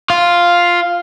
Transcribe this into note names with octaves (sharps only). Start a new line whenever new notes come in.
F4